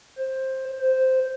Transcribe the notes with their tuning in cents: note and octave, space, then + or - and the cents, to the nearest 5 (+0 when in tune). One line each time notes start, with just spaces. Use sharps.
C5 +15
C5 -5